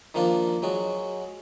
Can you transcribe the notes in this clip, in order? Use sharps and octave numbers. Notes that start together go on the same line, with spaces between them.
D#3 F3 A#3 D4 F4
F#3 G#3 F#4